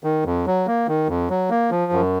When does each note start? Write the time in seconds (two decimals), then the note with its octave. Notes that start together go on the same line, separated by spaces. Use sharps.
0.04 D#3
0.25 F2
0.46 F#3
0.67 A#3
0.88 D#3
1.09 F2
1.30 F#3
1.50 A#3
1.71 F3
1.92 F#2